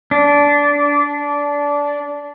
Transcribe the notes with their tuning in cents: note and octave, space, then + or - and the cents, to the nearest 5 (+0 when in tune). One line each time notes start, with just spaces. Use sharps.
D4 -20